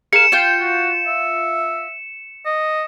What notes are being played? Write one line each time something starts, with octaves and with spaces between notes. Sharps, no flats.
G#4 A#4 F5 C#7 E7
F4 G5 C#7
F#4
E5
D#5